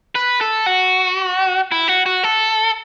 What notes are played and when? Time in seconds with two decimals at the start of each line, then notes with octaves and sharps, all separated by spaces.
0.15 B4
0.41 A4
0.66 F#4
1.72 E4
1.88 F#4
2.06 F#4
2.24 A4